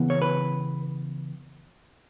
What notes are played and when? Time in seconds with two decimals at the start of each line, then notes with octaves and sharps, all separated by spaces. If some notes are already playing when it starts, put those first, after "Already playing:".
Already playing: C#3 E3 B3
0.10 C#5
0.22 B4